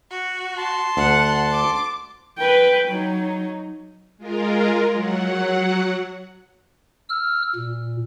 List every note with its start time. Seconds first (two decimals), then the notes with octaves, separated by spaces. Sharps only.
0.11 F#4
0.57 A5 C6
0.97 D2 F#5
1.51 D6
2.38 B4 G5
2.88 F#3 D#4
4.18 G#3 F4 A#4
4.93 F#3 F#5
7.09 E6 F6
7.55 A#2